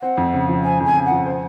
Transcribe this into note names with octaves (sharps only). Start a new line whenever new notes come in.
C4 F#5
F2
C#3
F3
C4 G#5
F2 G#5
C#3
F3 F#5
C5